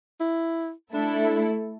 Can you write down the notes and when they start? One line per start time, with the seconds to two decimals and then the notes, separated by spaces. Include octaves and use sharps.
0.20 E4
0.94 A3 D4 E4 A4